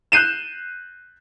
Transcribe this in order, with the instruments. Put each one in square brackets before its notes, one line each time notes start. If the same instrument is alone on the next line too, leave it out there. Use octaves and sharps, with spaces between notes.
[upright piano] F#6 G6 C7 D#7 E7